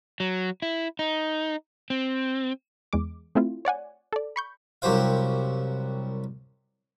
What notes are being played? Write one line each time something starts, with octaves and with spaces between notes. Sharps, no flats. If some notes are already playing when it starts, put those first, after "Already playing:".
F#3
E4
D#4
C4
E2 G#3 D6
A3 C4 E4 F4
C#5 D5 F#5 G#5
A4 D5
B5 C#6 G6
C2 F#2 F#3 G4 C5 F5